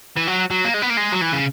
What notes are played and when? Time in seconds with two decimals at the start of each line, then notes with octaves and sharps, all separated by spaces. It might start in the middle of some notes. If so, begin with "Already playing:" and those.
0.17 E3
0.28 F#3
0.51 F#3
0.65 A#3
0.74 G#3
0.82 B3
0.90 A#3
0.97 G#3
1.13 F#3
1.22 E3
1.33 C#3